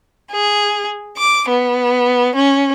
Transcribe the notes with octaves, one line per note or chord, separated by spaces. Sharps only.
G#4
D6
B3
C#4